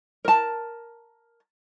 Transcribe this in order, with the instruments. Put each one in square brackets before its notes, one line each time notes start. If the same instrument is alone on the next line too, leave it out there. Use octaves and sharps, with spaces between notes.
[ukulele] A#4 A5